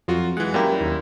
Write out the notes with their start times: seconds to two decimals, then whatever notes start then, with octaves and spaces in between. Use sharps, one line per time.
0.08 F2 F#3 F4 F#4
0.37 E3 G#3 F#5
0.54 F#2 G3 A#3 E4 G4
0.81 D#2